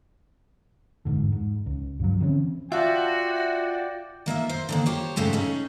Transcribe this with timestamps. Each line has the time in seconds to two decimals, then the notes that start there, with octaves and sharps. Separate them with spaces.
1.05 G1 E2 G#2 D3
1.32 G#2
1.66 C#2
1.99 G2 C#3 F3 F#3
2.20 D3 E3 C4 C#4
2.72 F4 F#4 D5 E5 F#5 G5 A5
4.26 D#3 A#3 D#5 E5
4.49 C5
4.69 D3 D#3 A#3
4.86 G4 C5 C#5
5.16 G#2 C#3 A3 G4 A4
5.33 C#4 D#4 G#4